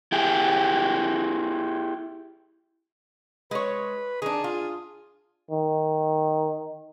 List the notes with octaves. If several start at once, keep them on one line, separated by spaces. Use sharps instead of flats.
E4 G4 G#4
G#3 B4 C#5
D#3 D4 G#4
F4
D#3